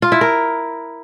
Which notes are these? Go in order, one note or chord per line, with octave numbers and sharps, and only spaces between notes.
F4
E4
A#4